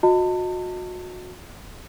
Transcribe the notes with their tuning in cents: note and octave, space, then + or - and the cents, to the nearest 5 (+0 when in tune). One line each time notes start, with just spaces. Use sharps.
F#4 -30 D#5 +0 A5 +35